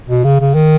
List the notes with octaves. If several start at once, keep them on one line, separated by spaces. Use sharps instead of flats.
B2
C#3
C#3
D#3